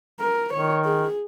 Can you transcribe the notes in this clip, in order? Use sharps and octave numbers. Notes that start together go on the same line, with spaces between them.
A#4
D#3 C#5
G#4